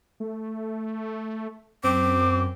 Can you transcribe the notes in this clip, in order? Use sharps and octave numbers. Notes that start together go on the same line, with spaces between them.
A3
F#2 C4 D6